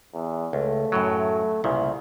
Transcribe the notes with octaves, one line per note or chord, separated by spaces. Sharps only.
E2
C#2 A3
F#2 A2 F#3
C2 A#2 C#3 E4